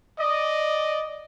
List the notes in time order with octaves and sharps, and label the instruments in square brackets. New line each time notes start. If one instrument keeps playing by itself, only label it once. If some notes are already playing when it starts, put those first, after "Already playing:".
[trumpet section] D5 D#5